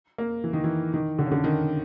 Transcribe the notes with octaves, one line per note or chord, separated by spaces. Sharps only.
A#3
E3
D#3
E3
D#3
D3
C#3
D3
D#3